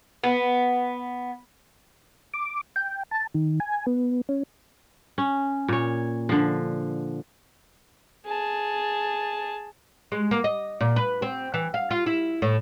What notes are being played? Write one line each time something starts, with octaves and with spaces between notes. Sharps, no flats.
B3
D6
G5
A5
D#3
G#5
B3
C#4
C#4
A#2 C#5
D3 F3
G#4 A5
G#3
A#3
D#5
A#2
B4
C4
E3
F5
F4
E4
A2